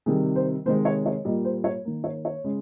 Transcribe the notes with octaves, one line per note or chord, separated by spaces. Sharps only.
C3 D#3 G3 G#4
C5
C3 D#3 G#3 C5
C#5
C#5
A#2 G3 A#3 D#5
C5
C#5
D#3 A#3
C#5
C#5
C#3 G#3